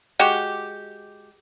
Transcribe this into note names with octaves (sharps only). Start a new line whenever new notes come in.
G#3 F#4 G4